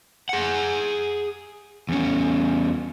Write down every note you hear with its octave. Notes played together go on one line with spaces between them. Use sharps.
G#4 F#5
E2 C#4